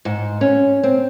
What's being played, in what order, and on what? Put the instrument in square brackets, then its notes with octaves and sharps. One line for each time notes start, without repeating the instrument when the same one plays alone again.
[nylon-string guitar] G#2
C#4
C4